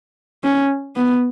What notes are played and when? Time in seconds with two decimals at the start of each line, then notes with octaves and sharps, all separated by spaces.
0.44 C#4
0.96 B3